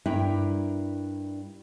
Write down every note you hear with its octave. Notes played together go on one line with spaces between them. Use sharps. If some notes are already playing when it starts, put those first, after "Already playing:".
G2 D4 E4 A#4 G5